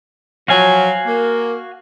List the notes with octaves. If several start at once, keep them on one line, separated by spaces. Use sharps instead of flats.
F3 F#3 F#4 F5 G#5
A#3